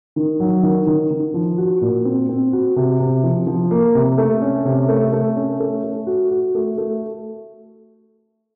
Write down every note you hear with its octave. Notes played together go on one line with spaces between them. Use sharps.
D#3
F#3
D#3
D#3
D#3
F3
F#4
A#2
C4
C4
F#4
C3
C3
F3
F3
A#3
C3
A3
C#4
C3
A3
A3
C#4
A3
A3
F#4
F#4
A3
A3